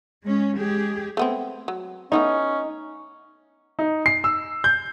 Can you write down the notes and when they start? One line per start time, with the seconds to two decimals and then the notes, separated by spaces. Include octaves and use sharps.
0.25 G#3 C#4
0.59 G#3 G4 G#4
1.17 A3 B3 C4
1.68 F#3
2.12 A3 B3 C#4 D#4 E4
3.79 D#4
4.06 C7
4.24 E6
4.64 G6